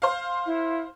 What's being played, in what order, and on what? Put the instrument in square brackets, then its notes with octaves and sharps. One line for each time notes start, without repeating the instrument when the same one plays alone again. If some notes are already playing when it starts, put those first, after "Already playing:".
[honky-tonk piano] C5 F5
[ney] E4